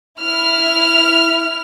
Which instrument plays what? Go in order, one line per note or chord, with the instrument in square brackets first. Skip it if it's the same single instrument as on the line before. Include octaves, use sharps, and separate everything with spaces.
[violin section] E4 F6